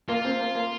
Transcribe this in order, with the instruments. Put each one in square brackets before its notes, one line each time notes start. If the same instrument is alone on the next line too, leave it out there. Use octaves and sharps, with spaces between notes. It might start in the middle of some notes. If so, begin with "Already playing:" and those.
[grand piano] A#3 [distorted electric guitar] F4
[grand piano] C4
A#3
A#3